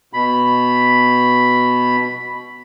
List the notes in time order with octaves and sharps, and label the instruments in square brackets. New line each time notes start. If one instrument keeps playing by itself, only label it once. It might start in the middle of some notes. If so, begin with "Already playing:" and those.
[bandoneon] B2 B5